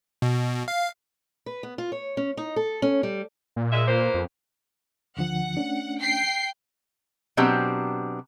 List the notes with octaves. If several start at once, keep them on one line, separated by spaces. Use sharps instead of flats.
B2
F5
B4
B3
F4
C#5
C#4
D#4
A4
C#4
G3
A#2
G#3 E5
A#3 B4 C5
F2
D2 D3 F3 F#5
A3 C#4 D4
G5 C7
B2 F#3 C4 D4 G4